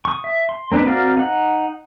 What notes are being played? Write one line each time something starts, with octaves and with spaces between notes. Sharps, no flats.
C#6 D#6
E5
C6
A#3 C4 D4 D#4 B4
C4 F#4 A#4 D5 F5
D#4 F#5